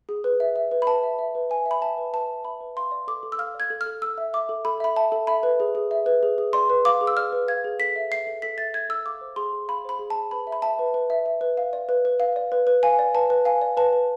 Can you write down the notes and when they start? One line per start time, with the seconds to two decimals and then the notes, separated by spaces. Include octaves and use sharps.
0.09 G#4
0.24 B4
0.40 E5
0.56 E5
0.71 B4
0.82 B5
0.87 B4 A5
1.03 E5
1.19 E5
1.35 B4
1.50 B4 G#5
1.66 E5
1.71 B5
1.81 E5 A5
1.98 B4
2.13 B4 A5
2.29 E5
2.45 E5 B5
2.61 B4
2.76 F5 C6
2.91 D5
3.08 A4 D6
3.23 A4
3.32 E6
3.38 F5 F6
3.54 D5
3.60 G#6
3.70 A4
3.81 F6
3.86 A4
4.02 A4 E6
4.18 E5
4.34 E5 D6
4.49 A4
4.65 A4 B5
4.80 E5 B5
4.96 E5 A5
5.12 A4
5.27 E5 B5
5.43 B4
5.60 G#4
5.75 G#4
5.91 E5
6.06 B4
6.23 G#4
6.38 G#4
6.53 D5 C6
6.70 B4
6.85 F5 D6
7.01 G#4
7.07 E6
7.17 D5 F6
7.32 B4
7.48 F5 G#6
7.64 G#4
7.79 A4 B6
7.96 E5
8.11 E5 C7
8.27 A4
8.42 A4 B6
8.58 E5 A6
8.74 E5 G#6
8.89 A4 E6
9.05 F5 D6
9.21 C5
9.36 G#4 C6
9.53 G#4
9.68 F5 B5
9.85 C5 B5
9.99 G#4
10.10 A5
10.16 G#4
10.31 B4 B5
10.47 E5
10.52 B5
10.62 E5 A5
10.79 B4
10.94 B4
11.10 E5
11.26 E5
11.41 B4
11.57 F5
11.73 D5
11.89 B4
12.05 B4
12.20 F5
12.36 D5
12.52 B4
12.67 B4
12.83 F5 G#5
12.99 D5
13.14 B4 A5
13.30 B4
13.45 F5 G#5
13.62 D5
13.77 B4 A5
13.93 B4